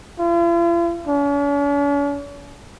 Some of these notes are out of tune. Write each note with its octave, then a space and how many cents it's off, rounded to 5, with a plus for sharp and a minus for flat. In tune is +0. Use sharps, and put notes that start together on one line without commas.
F4 -45
C#4 +45